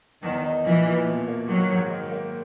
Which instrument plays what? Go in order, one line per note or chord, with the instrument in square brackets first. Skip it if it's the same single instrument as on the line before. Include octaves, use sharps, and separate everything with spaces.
[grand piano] E2 [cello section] D#3
[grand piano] D#4
[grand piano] A#2 [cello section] E3
[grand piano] A#2
B2
A#3
[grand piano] D#3 [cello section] F#3
[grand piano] G#2
D#3
A#3